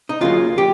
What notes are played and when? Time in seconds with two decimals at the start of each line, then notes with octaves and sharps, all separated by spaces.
0.09 D#4
0.21 D2 C#3 F#3 A#3 F4
0.58 G4